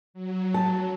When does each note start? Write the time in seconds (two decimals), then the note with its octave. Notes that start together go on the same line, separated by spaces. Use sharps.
0.14 F#3
0.54 A5